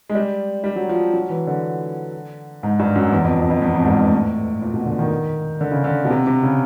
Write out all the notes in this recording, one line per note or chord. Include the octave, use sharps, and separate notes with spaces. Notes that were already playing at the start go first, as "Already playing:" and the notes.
G#3
G3
G3
F#3
F3
F#3
E3
D3
G#2
G2
F#2
E2
F2
F2
F2
E2
F2
G#2
G2
G#2
A2
A#2
B2
D3
D#3
D3
C#3
D3
B2
C3
C3
C#3